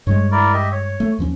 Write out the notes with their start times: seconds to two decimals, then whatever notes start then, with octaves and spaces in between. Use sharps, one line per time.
0.07 G2 G3 G#3 C#5
0.32 E4 A#4 D5
0.54 G4 D#5 E5
0.72 C#5
1.00 A3
1.19 D#2 F3 C#4